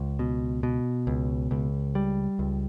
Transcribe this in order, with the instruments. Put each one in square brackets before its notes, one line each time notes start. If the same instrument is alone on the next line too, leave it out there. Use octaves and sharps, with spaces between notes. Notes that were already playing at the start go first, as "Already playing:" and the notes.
Already playing: [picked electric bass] C#2
B2
B2
C#2
C#2
G3
C#2